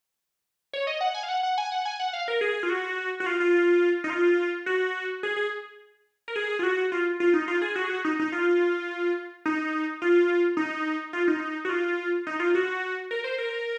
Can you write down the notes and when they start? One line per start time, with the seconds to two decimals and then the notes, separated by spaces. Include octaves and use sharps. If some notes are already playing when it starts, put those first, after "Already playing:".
0.73 C#5
0.87 D#5
1.01 F#5
1.14 G#5
1.23 F5
1.29 F#5
1.43 F#5
1.58 G#5
1.72 F#5
1.85 G#5
2.00 F#5
2.13 F5
2.28 A#4
2.41 G#4
2.63 F4
2.70 F#4
3.20 F#4
3.26 F4
3.40 F4
4.04 D#4
4.10 F4
4.66 F#4
5.23 G#4
5.36 G#4
6.28 A#4
6.36 G#4
6.59 F4
6.63 F#4
6.92 F4
7.20 F4
7.33 D#4
7.48 F4
7.62 G#4
7.76 F#4
7.84 G#4
7.90 F#4
8.05 D#4
8.19 D#4
8.32 F4
9.46 D#4
10.02 F4
10.57 D#4
11.13 F4
11.28 D#4
11.65 F#4
11.69 F4
12.27 D#4
12.40 F4
12.55 F#4
13.11 A#4
13.24 C5
13.38 A#4